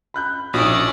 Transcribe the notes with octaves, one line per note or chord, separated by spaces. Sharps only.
B5 F#6 G6
A#1 B2 F3 C#4 D#4 D5 D#6